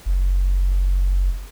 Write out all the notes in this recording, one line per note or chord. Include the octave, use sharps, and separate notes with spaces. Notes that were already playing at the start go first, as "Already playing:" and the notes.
F#1